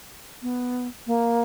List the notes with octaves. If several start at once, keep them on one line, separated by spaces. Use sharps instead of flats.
B3
A#3